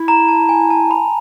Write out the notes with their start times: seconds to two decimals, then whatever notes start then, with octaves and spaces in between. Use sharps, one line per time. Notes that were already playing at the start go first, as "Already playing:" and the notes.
Already playing: E4
0.08 A#5
0.28 A5
0.49 G#5
0.70 A5
0.91 B5